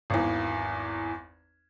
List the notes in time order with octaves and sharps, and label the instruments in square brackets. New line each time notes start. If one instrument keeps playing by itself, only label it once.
[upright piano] G#1 E2